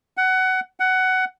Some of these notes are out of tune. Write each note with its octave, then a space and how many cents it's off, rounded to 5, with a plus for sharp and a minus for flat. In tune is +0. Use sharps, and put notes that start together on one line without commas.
F#5 +20
F#5 +15